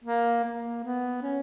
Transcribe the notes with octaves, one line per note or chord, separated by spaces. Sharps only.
A#3
A#3
B3
C#4